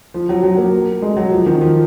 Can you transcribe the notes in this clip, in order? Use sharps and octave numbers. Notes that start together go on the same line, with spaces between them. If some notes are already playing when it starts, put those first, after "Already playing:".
F3
F#3
F#3
A#3
G#3
F#3
F3
D#3
F3